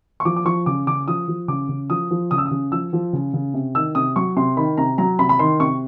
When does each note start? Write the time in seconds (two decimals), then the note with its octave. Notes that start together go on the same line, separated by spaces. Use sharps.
0.20 C#6
0.25 F3 D6
0.36 D6
0.45 F3 C#6
0.66 C#3 D6
0.87 C#3 D6
1.08 F3 D#6
1.28 F3
1.48 C#3 D6
1.69 C#3
1.90 F3 D#6
2.11 F3
2.31 C#3 D#6
2.38 E6
2.46 D#6
2.51 C#3
2.72 F3 E6
2.93 F3
3.13 C#3
3.33 C#3
3.54 C3
3.75 D#3 E6
3.95 C3 D#6
4.16 F#3 C#6
4.36 C3 C6
4.57 D#3 B5
4.78 C3 A#5
4.98 F#3 A#5
5.19 C3 B5
5.29 B5
5.39 D#3 C6
5.60 C3 C#6